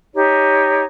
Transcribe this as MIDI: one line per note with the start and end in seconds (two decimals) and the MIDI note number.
0.14 0.82 63
0.14 0.82 67
0.14 0.82 73